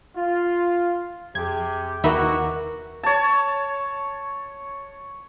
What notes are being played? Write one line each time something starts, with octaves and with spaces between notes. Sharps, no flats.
F4
F2 C3 G4 G#4 G#6
D#2 E3 D#4 F#4 A#4 E5 B5 D6
C#5 A5